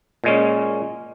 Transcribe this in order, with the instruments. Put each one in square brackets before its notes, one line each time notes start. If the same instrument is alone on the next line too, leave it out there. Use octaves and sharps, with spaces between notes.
[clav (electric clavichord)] A#2 G#3 C#4